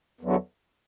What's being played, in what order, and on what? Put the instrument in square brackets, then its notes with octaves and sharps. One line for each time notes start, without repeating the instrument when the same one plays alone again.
[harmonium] E2 D3 F#3